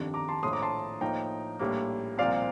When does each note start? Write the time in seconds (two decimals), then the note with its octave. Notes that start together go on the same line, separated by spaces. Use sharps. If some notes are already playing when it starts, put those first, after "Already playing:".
Already playing: G1 F2 D#3 G3 D4
0.14 A#5 D6
0.28 A5 C6
0.43 A#1 A2 F3 C6 D#6
0.53 A#5 D6
0.62 A5 C6
1.01 A2 F3 A#3 D#4 G5 A#5
1.59 A#1 A2 G3 A#3
2.18 C2 A#2 F3 C4 D5 F5